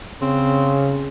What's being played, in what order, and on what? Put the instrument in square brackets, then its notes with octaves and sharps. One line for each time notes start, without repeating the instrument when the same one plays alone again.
[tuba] C#3 [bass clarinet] C4